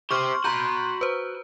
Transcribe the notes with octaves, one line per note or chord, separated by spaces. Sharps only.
G4 C5 C6 C#6 F6
F#4 A#5 B5 G6
B4 C5